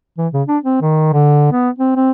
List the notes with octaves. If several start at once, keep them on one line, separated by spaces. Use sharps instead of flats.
E3
C#3
D4
C4
D#3
D3
B3
C4
C4